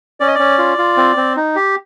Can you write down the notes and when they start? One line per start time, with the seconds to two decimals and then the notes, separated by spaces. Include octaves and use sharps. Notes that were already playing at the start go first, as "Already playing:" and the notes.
0.20 C#4 D5
0.27 D#5
0.35 C#4 D5
0.58 F4
0.78 F4
0.97 C4
1.17 C4
1.36 D#4
1.56 G4